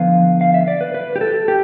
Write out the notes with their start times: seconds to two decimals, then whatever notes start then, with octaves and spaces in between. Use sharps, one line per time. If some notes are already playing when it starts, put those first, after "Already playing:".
Already playing: D3 F3 B3 F5
0.41 F5
0.54 E5
0.68 D5
0.81 B4
0.94 B4
1.16 G4
1.21 A4
1.48 G4